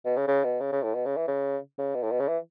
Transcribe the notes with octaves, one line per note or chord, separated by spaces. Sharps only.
B2
C#3
C#3
B2
C#3
C#3
A2
B2
C#3
E3
C#3
C#3
B2
A2
B2
C#3
E3